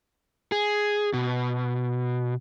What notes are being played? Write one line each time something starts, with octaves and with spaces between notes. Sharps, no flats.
G#4
B2